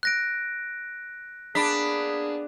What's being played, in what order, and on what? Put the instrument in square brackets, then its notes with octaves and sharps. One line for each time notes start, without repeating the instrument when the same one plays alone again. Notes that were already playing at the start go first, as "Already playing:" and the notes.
[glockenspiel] F#6 A#6 D7
[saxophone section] A#3 B3 G#4 [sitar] D4 [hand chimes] B5 B6